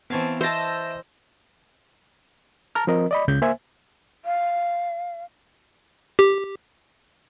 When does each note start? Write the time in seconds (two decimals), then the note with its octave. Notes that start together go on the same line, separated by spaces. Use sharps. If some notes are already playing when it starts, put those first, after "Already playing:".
0.10 E3 B3 C4 C#5 F5 A5
0.41 C5 D#5 E5 A5 E6 A#6
2.75 A5 A#5 F6
2.87 F3 C4 A#4 D#5
3.11 D5 D#5 B5
3.28 C#2 C#3 G6
3.42 A#3 C5 E5 G#5
4.25 F5
6.19 G4